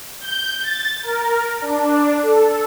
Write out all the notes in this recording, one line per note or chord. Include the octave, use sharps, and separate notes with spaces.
G6
A6
A#4
D4
A4